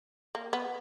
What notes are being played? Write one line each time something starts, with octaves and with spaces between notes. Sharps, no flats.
A#3
B3